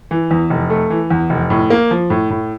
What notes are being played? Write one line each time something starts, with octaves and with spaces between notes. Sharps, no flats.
E3
E2
F1
A3
E3
E2
F1
A2
A#3
F3
A2
A2